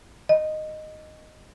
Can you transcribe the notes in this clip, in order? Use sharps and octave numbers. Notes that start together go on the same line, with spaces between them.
D#5